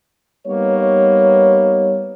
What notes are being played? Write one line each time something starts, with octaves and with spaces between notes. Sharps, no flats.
G3 A#3 B3 D#4 C#5